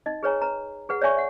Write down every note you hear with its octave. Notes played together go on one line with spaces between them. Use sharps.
D#4 D#5
G#4 B4 C#5 G#5 A#5
B4 A#5
G#4 B4 F#5
C#5 D5 E5 G#5 C#6
E5 F#5